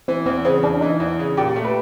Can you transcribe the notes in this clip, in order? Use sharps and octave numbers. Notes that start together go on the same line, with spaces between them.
E3 C4
E2 C4
C#3 C4
E2 D4
E3 D#4
E2
C#3
A#2 G4
A3
B4